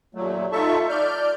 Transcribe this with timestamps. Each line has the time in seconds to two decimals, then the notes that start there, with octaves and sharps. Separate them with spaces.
0.15 D#2 A#2 F#3 A3
0.52 D#4 F4 A4 E5 A5 C#6
0.89 D5 F6 G6